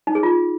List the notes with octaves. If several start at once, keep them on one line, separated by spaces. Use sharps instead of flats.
D#4
G#4
F4